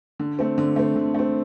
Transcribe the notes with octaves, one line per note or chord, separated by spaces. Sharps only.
D3
A3 C4
D3
A3 C4
D3
A3 C4